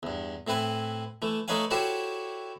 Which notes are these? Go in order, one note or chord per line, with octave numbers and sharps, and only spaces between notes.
E2 G2
A2 C4 E4 B4 G#5
E3 A3
A3 D#4 B4 C#5 F5 G#5
E4 F#4 G4 A4 C5 C#5